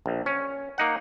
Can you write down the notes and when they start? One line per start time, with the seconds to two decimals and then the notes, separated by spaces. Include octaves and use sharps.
0.06 A#1
0.26 C#4
0.78 A#3 D#4 F#5